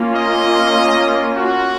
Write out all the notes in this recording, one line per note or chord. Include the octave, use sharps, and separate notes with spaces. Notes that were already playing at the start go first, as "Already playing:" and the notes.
Already playing: A#3 C#4 F4
D#5
F#4